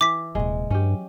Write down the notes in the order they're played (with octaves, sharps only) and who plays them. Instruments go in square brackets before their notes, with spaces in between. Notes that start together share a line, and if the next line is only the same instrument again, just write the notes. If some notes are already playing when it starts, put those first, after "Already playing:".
[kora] E3 [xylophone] D6 B6
[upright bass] D#1 C3 [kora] G#3
[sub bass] G2 [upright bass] F#3 [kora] C#4 G4